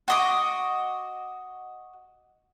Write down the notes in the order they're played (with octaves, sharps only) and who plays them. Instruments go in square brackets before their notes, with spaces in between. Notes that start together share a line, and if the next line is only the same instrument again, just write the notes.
[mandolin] F#4 D#5 D6